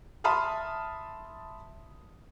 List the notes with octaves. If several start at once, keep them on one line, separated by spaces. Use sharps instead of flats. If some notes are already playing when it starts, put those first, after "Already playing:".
E5 A5 B5 C6 D#6 F6